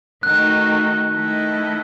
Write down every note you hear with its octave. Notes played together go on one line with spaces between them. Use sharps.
D#3 A3 D#4 F#4 F#6
D#3 A3 E4 A4 D#5